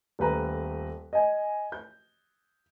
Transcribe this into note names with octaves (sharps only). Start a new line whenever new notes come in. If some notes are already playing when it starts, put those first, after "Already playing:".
D#1 A3 B4 A#5
D#5 G#5
G6